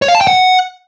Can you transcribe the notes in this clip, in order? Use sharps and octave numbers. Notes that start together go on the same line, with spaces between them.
C#5
F5
A5
G5
F#5